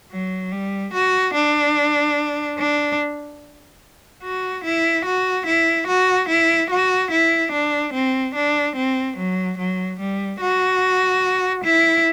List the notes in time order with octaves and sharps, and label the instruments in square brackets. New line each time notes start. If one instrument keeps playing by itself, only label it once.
[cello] F#3
G3
F#4
D4
D4
F#4
E4
F#4
E4
F#4
E4
F#4
E4
D4
C4
D4
C4
F#3
F#3
G3
F#4
E4